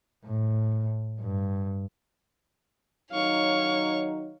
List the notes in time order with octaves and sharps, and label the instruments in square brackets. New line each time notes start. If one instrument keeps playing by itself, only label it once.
[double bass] A2
G2
[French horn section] D#3 F#3 D#4 [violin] C#5 [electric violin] F5 C#6